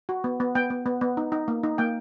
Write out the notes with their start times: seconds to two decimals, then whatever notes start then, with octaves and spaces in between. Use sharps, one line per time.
0.09 F#4
0.24 B3
0.40 B3
0.55 B3 G5
0.70 B3
0.86 B3
1.01 B3
1.17 D#4
1.32 D#4
1.48 A#3
1.63 D#4
1.78 A#3 G5